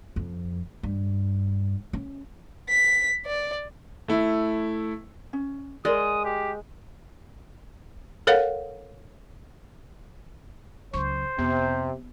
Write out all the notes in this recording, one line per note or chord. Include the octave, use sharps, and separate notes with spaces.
F2
G2
C#4
B6
D5
A3 E4
C#4
G#3 A#4 D5 D#6
G4
A4 A#4 C#5 F5 F#5
C#2 F#3 C5 C#6
F2 C3 B3